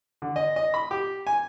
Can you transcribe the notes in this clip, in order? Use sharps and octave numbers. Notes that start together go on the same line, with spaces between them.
D3
D#5
D#5
B5
G4
G#5